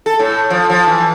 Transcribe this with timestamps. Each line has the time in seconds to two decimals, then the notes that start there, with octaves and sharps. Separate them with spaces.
0.06 A4
0.19 A2
0.50 F3
0.70 F3
0.87 E3